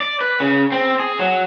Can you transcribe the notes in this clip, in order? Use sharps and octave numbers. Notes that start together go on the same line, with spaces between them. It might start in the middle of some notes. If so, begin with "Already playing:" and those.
D5
B4
C#3
C4
G#4
F#3